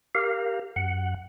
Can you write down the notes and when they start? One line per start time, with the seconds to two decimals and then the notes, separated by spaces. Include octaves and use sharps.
0.15 G4 A#4 F5
0.76 F#2 F#5